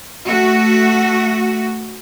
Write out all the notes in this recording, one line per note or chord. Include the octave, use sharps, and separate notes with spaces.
A3 F#4